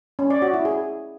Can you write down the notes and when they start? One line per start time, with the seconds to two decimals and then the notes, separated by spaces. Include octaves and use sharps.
0.19 C#4
0.30 D5
0.42 F#4
0.54 E4
0.65 G#4